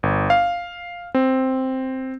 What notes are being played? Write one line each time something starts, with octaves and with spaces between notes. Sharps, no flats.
G1
F5
C4